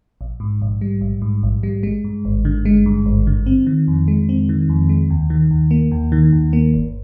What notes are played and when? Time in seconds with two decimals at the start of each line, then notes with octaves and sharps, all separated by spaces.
0.21 A#1
0.40 G#2
0.62 A#1
0.81 G3
1.01 A#1
1.22 G#2
1.43 A#1
1.63 G3
1.83 G#3
2.04 G2
2.25 G#1
2.45 D3
2.65 G#3
2.86 G2
3.06 G#1
3.27 D3
3.46 C4
3.67 D#3
3.88 F2
4.08 G#3
4.29 C4
4.49 D#3
4.69 F2
4.89 G#3
5.10 D#2
5.30 D#3
5.51 D#2
5.71 A#3
5.92 D#2
6.12 D#3
6.32 D#2
6.53 A#3
6.74 G1